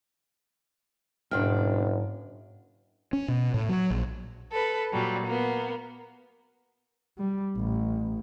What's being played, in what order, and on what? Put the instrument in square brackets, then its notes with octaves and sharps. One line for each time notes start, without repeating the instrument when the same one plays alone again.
[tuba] F#1 [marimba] G#2 F6 [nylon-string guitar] B2 D4 G5
[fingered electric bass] C#4
B2
A2
F#3
A#1
[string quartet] A4 B4
A#2 F#3 G3
A#3 B3
[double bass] G3
A1